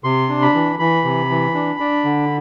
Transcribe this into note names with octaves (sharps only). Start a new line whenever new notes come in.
C3 C6
D4
B5
E3
E3 B5
C3
E3
D4
D4
D3